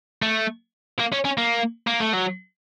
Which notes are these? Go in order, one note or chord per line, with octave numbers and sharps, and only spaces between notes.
A3
A#3
C#4
C#4
A#3
A#3
A3
F#3